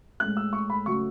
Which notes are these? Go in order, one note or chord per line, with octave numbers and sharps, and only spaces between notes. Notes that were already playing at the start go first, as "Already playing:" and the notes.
A2 G#3 F#6
E6
C#6
B5
C#3 F#3 A3 C#6